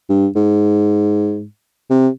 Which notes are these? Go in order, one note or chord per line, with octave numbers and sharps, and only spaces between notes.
G2
G#2
C3